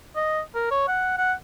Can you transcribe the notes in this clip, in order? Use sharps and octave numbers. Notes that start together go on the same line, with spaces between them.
D#5
A#4
C#5
F#5
F#5